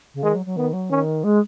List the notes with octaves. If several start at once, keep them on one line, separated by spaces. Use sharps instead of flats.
C#3
D#3 G#3
F#3
F#3
D#3 B3
F#3
D#3 C#4
G#3